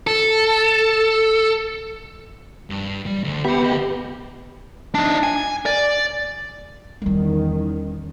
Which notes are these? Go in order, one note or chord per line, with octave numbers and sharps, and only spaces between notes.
A4
G2
G3
D2
B3 G4 E5 G5
D2 D#5
D4 D#4
G#5
D5
E2 D#3 G3 C#4